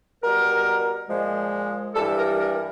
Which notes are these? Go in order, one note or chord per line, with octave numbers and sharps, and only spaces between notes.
B2 G3 A#4
A#2 F3 G#3
G2 E3 G3 A4
A#4
A#4